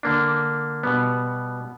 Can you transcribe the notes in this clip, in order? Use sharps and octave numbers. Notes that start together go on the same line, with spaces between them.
D3 A#3 D4
B2 G3 B3